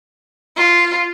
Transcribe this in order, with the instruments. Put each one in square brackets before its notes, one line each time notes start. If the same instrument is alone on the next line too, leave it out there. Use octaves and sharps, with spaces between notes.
[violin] F4